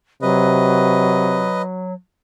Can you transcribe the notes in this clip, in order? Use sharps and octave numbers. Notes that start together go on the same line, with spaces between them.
C3 F#3 B4 D#5